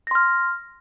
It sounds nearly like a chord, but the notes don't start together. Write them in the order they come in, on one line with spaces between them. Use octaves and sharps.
A#6 C6 F6